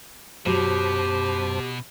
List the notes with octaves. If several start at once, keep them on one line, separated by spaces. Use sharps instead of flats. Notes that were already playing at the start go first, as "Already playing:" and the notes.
F#2 B2 F#3 G4 C5 A5